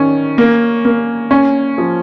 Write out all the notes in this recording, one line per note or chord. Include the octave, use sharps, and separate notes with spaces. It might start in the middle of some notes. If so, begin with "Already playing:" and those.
Already playing: D#3 C#4
A#3
A#3
C#4
F3